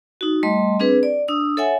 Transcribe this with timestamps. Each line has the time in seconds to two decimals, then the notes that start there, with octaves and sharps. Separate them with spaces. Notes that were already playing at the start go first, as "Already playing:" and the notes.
0.21 D#4 F#4
0.43 G3 A3 D#5 C6
0.79 C4 D4 G#4 B4
1.03 D5
1.28 D4 D#6 E6
1.57 A4 C#5 E5 F#5 G#5